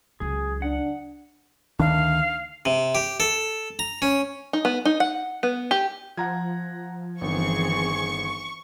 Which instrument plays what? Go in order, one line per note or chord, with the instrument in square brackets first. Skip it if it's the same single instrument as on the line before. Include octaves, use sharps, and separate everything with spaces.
[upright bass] C#2 F#3 [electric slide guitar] G#4
[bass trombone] D4 [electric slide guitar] F#5
[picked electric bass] D2 D#3 D4 [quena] F5
[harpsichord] C3
G4
A4
A#5
C#4
[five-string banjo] D#4
B3
D#4
F#5
B3
G4
[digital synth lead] F3 [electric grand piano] F#5 A#5 G#6
[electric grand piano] G1 D#3 [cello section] E3 C4 G#4 [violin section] C#6